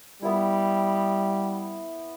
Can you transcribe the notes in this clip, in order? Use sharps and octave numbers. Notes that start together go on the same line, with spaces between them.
G3 B3 E4